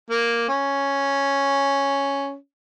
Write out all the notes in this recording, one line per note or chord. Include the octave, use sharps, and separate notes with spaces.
A#3
C#4